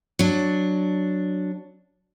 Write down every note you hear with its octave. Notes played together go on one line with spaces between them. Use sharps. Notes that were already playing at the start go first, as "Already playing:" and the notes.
F#3 D4